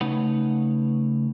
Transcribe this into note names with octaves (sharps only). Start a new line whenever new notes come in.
C#3 A3 D#4 B4 C#5 F#5